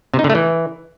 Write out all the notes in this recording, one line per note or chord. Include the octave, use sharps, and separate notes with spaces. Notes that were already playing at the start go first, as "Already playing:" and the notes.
C3
D#4
D3
A3
E3